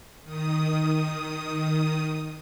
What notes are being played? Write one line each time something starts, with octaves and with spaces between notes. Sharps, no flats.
D#3 D#6